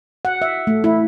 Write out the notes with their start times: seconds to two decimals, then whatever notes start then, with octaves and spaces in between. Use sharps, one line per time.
0.25 F#5
0.42 E5
0.67 A3
0.84 E4